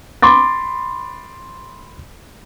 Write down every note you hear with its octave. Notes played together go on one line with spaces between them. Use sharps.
B5 C6 D6 A6